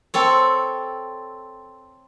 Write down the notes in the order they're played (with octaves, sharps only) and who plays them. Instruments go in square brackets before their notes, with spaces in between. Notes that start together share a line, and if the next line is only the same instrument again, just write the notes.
[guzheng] C4 A4 C#5